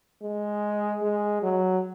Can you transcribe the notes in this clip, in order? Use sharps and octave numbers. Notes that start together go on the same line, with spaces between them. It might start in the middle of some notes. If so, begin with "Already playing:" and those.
G#3
G#3
F#3